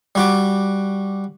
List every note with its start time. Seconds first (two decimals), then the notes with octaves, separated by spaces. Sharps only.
0.15 G3 F#4 D6